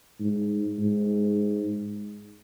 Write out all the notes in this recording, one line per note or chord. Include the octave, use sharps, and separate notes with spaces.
G#2
G#2